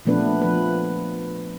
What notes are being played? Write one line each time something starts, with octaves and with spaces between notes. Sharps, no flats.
A#2 F3 A3 B3 D4 B4
F3 B4